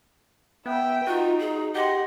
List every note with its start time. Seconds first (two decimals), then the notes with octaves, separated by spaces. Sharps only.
0.66 B3 E5 G5
1.07 D#4 F4 F#4
1.40 G#4
1.75 G4 D#5 F#5 C6